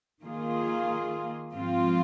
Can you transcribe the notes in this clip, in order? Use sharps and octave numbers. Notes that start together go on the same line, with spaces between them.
D#3 A#3 F4 G#4
G#2 F3 C4 F4